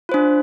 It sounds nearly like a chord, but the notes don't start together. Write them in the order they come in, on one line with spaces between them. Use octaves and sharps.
F4 C5 D4